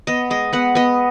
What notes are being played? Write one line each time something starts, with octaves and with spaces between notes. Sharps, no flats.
B3 D#5
G#3 D#5
B3 F#5
B3 D#5